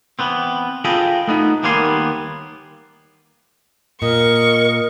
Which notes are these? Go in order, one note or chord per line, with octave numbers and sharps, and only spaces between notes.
E3 B3 C4
F4 G#4 A4 D#5 G5 B5
A3 B3 D#4
D#2 G3 A#3 B3 G#5 C6
A#2 A#4 D#5 C#6